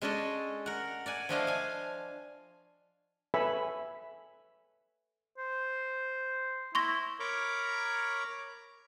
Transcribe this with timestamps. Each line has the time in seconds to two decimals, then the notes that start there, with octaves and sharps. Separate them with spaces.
0.02 G#3 C#4 D4 A4 D#5
0.66 A#4 F#5
1.06 D5 F#5 G#5
1.29 F3 A3 D4 E4 D#5 F5
1.47 F5 G#5
3.34 A4 B4 C#5 E5 G#5 B5
5.38 C5
6.75 E4 C6 C#6 A#6
7.20 A#4 C#5 A#5 B5 C#6 D6